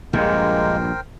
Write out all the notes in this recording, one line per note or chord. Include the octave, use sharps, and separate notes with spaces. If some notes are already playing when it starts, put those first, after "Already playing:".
A#1 G2 A#2 G#3 A#3 A#4 C5 G5